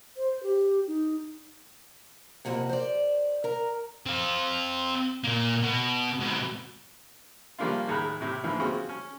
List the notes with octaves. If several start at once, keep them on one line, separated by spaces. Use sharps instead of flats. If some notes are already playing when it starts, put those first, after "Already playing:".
C5
G4
D#4
F2 C3 F3 A#3 F#5
C5 D5
A#4 A#5
C4 F5
A#2 A#3
B2
G#2 B2
F3 G3 A#3 C#4 D4 F4
D#2 A2 G#4 A#5 B5 F#6
A2 C3 G4
G#2 D3 E3 F3 A#3 E4
C4 C#4 F4 F#4 G#4
C#4